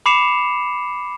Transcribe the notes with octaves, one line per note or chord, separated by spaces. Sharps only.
B5 D6 C7 C#7 E7 F7